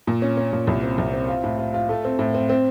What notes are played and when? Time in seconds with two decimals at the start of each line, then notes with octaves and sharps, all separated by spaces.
0.07 A#2
0.22 C#4
0.37 C#4
0.53 A#2
0.67 C2
0.83 C4
0.98 C2
1.13 C4
1.28 F4
1.44 A2
1.59 F4
1.74 F4
1.89 A3
2.05 C4
2.19 A2
2.35 C4
2.49 C4